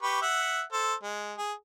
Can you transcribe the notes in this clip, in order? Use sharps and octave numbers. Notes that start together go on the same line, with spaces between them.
G4 B4 C#6
E5 F#5
A4 C5
G#3
G#4